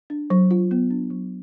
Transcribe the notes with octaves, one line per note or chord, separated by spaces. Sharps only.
D4
F#3
F4
B3
D4
F#3